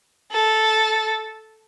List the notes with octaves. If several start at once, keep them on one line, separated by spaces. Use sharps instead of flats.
A4